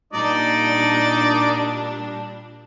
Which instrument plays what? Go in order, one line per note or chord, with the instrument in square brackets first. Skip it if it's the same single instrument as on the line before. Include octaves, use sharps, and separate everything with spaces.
[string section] A#2 G3 D4 [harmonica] D#4 D5 D#5